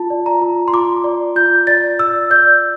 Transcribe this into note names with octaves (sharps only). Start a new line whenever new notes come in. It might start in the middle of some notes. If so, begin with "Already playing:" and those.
Already playing: F4 A5
D5
A#5
F4
C6
F4 D6
D5
F4 G6
D5 A6
D5 E6
D5 G6